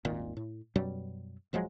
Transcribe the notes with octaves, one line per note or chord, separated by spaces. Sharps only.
D#1 G#1 A#2 D#3
A2
F#2 B2 F#3 G3
D#1 F3 F#3 G#3